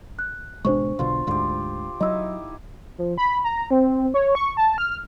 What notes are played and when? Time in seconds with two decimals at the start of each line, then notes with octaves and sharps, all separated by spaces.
0.19 F#6
0.65 G#1 B2 G#3 D4 C5 C#6
0.99 B1 B2 D3 F4
1.27 D2 G#2 D3 F4 G4
2.00 F#3 D#4 E4 D#5 E6
2.98 F3
3.18 B5
3.45 A#5
3.70 C4
4.14 C#5
4.35 C#6
4.57 A5
4.78 F6